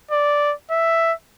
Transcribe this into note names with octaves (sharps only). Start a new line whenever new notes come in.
D5
E5